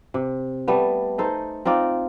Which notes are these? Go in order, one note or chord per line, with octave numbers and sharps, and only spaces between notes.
C3
G3 A3 B3
D#4 A4 C5
C4 D#4 F4 D5